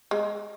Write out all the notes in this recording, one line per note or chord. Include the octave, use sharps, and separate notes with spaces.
G#3